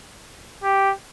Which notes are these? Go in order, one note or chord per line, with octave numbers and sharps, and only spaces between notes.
G4